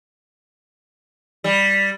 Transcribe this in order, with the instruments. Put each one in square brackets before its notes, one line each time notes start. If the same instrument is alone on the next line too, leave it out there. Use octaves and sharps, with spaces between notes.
[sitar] G3